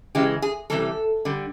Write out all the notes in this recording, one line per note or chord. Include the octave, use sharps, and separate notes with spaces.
C#3 E3 G#3 G4
G#4
C3 E3 G3 A4
D3 G3